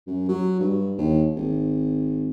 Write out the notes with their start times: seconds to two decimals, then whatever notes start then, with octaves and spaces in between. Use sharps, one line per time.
0.07 F#2
0.29 F#3
0.60 G2
0.98 D#2
1.36 G#1